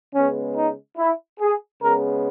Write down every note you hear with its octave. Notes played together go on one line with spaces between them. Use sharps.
C#3 G#3 B3 C#4
D#4
E4
G#4
C#3 G#3 B3 A#4